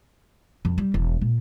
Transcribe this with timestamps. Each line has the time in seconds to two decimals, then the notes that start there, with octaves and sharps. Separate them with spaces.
0.65 F2
0.78 G3
0.94 E1
1.21 A#2